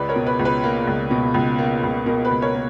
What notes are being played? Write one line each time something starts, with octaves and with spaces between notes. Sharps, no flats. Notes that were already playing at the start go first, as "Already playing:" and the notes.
Already playing: C#2 B4 D5
A#4 C#5
B2
B4
C#2
B4
A#3
C#2
B2
C#2
A#3
C#2
B2 A#4
B4
C#2
A#4 C#5
A#3